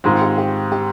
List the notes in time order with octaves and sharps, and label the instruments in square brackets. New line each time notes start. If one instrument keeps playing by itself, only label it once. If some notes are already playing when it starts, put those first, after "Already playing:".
[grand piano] G#2 D#3 G#3 C4 [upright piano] F4
[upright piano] G4
G4
G4